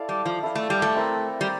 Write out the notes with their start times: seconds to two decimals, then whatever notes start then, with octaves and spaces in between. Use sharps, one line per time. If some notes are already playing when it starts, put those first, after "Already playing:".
Already playing: E4 A4 D5 F5
0.09 G3
0.26 F3
0.43 E4 A4 D5 F5
0.55 A3
0.70 G3
0.82 A3
0.94 C4 E4 A#4
1.41 G3